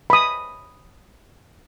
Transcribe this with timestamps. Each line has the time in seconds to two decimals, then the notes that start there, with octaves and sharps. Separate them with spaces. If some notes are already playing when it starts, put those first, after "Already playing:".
0.10 B5 D#6